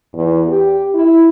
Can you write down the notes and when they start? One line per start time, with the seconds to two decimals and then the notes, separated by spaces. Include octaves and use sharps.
0.13 E2
0.48 G4
0.94 E4